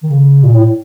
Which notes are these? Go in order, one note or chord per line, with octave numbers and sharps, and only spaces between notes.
D#3
C#3
A#2
A2